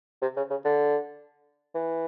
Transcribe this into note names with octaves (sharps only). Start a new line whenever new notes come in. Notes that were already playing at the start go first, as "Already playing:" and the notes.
C3
C#3
C#3
D3
E3